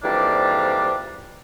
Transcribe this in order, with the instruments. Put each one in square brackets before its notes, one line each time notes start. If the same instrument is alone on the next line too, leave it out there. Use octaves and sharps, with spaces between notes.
[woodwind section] F2 G#2 E3 G3 A#3 D4